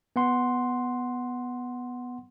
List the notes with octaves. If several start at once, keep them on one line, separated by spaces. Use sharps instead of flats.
B3 F#5 C6